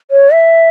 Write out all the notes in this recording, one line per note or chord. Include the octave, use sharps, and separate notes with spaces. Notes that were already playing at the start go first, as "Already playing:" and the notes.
C#5
E5